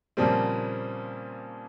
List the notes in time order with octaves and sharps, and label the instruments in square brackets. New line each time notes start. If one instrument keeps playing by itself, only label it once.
[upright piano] A#2 C#3 F3 G3 A#3 C4